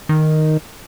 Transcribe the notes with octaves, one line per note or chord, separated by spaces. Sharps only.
D#3